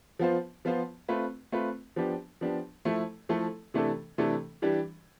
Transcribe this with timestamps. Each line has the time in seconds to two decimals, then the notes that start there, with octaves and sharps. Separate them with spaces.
0.19 F3 B3 F4 C5
0.65 F3 B3 F4 C5
1.08 A3 C4 F4 B4
1.52 A3 C4 F4 B4
1.96 F3 B3 D4 G4
2.41 F3 B3 D4 G4
2.85 F3 A3 E4 A4
3.29 F3 A3 E4 A4
3.74 C3 E3 A3 D4 A4
4.18 C3 E3 A3 D4 A4
4.62 E3 G3 D4 G4